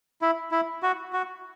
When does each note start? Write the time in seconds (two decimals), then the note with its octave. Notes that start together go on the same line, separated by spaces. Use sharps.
0.22 E4
0.52 E4
0.83 F#4
1.13 F#4